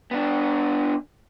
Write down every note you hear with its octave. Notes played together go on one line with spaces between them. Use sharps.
B3 D4